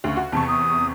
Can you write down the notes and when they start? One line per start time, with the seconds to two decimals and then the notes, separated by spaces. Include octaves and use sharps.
0.04 D2 C#3 C#6
0.17 F#4
0.32 E2 C3 A5 C#6
0.48 D#6